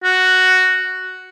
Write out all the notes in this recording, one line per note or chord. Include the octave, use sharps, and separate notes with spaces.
F#4